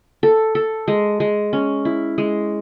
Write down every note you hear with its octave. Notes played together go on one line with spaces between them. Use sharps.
A4
A4
G#3
G#3
C#4
E4
G#3